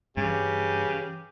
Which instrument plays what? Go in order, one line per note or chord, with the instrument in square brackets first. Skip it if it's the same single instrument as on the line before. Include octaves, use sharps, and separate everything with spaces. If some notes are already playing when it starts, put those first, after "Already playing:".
[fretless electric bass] G2 [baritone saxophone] C#3 [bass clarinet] E3 [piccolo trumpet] G4